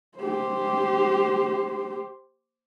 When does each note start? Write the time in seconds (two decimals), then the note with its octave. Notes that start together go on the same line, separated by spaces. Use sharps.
0.18 G4 C5